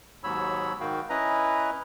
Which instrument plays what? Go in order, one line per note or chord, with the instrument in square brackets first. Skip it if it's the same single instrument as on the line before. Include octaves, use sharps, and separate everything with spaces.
[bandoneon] D#2 G#2 F#3 C#5 B5 E6
G#2 D#3 F#4 F5 G5
C#4 E4 B4 D#5 A#5